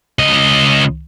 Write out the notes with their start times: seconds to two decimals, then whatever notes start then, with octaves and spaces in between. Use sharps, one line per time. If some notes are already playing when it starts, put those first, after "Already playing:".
0.19 C#2 D#5